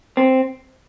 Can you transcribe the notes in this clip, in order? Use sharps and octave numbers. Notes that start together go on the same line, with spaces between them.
C4